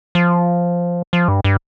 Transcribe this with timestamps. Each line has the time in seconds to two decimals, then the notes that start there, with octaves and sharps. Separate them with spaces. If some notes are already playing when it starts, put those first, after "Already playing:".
0.15 F3
1.13 F3
1.28 G2
1.44 G2